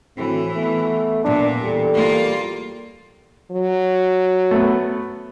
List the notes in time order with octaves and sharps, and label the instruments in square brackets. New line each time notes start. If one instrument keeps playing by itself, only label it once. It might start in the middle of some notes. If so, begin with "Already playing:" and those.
[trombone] A2 [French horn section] D3 C4 F#4 [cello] E3
[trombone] A3 [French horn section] B3
[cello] A#2 [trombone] D4
[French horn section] E2 A4 [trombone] G3
[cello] A#3 F4
[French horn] F#3
[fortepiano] A3 B3